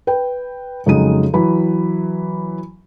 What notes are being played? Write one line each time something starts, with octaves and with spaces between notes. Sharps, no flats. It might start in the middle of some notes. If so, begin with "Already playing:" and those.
B4 G5
F2 C#3 F#3 G#3 D#4 D#7
E3 F#3 B5